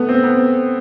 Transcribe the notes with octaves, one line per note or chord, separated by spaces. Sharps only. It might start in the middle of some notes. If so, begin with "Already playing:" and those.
Already playing: A3 B3
C4
B3